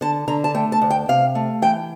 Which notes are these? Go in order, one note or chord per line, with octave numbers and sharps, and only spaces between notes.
D3 A5
D3 A#5
A5
A3 G5
A5
D2
G5
C3 F5
A3
E3 G5